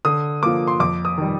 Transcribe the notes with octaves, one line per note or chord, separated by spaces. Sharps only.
D3 D#6
F3 A#3 D6
C6
F2 D6
D#6
D#3 G3